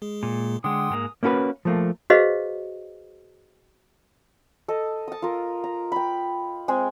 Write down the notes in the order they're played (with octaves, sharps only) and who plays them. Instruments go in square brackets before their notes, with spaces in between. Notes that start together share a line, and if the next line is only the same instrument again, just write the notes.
[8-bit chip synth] G#3 G#4
[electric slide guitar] A#2
[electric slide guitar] D3 G#3 [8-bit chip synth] F#5 G5 C6 [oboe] D#6
[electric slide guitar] G#2 G#3 A#3
[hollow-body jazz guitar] A#3 C#4 F#4 A4 B4
F3 A3 A#3
[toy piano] F#4 G#4 B4 C5 D#5 F5
[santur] A4 D#5
A5 D#6
F4 A#4
A#5
G5 B5
G#3 C4 G#4